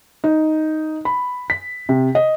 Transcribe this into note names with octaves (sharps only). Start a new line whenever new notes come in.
D#4
B5
B6
C3
D#5